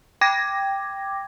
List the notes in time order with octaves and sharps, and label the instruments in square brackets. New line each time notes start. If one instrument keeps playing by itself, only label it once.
[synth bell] G5 D6 G#6 A#6